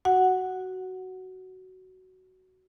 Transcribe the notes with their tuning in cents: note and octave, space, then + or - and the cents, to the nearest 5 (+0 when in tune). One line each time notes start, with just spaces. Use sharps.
F#4 +10 F#5 +0